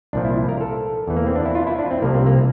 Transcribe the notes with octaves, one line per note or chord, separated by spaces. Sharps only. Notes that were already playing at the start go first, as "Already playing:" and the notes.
C2 A#2 F3 D4
E4
A#4
A4
E2 E3
A#3
C4
D4
E4
F4
E4
D4
C4
C2 C3 F3 A#3
C4
A#3